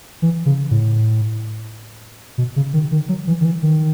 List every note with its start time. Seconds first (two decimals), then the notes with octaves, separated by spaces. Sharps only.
0.22 E3
0.46 C#3
0.71 A2
2.38 B2
2.56 C#3
2.73 D#3
2.91 D#3
3.09 F#3
3.27 E3
3.41 D#3
3.45 E3
3.63 D#3